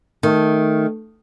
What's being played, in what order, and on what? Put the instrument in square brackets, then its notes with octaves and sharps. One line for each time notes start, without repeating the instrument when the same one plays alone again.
[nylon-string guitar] D#3 [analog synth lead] A3